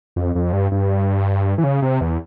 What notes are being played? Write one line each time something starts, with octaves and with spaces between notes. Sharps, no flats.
F2
F2
G2
G2
E3
C#3
C3
E2